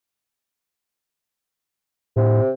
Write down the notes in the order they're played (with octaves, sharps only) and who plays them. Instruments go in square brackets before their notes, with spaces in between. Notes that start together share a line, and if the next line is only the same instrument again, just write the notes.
[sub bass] A2 [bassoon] C3